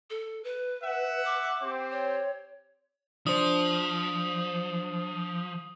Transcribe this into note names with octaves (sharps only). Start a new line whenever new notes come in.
A4
B4
E5 F#5
D6
C4 G4 C5
C#5
F3 D4 C5 D#6